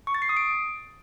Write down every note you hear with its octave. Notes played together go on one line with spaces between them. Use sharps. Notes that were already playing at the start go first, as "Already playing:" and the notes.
C#6
A6
C7
D#6
D7